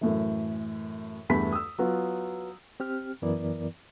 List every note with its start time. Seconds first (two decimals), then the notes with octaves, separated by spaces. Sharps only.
0.01 F#2 A2 E3
1.29 E2 G2 A3 B5 B6
1.52 D#6 E6
1.79 F#3 B3 F4
2.80 C4 G4 F6
3.22 F#2 E3 B3 E4 A#4 D5